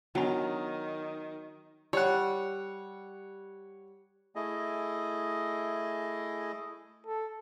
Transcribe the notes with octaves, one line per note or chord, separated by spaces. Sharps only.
D#3 F#3 B3 D4 G#5
G3 C#5 F#5
A3 E4 G#4 D#5
A4